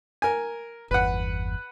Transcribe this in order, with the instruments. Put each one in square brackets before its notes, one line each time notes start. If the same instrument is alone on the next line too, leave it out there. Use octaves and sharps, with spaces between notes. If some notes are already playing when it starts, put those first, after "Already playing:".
[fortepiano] A#4 G#5
[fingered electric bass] G1 E2 [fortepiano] B4 F#5